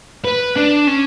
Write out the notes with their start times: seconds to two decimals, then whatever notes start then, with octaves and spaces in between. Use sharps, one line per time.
0.24 B4
0.56 D4
0.87 C#4